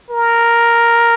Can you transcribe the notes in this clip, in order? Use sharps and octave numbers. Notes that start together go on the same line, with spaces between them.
A#4